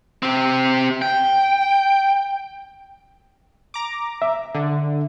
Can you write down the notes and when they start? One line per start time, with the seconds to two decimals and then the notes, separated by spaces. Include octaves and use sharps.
0.23 C4 G4
1.02 G5
3.74 A#5 D6
4.22 E5
4.55 D3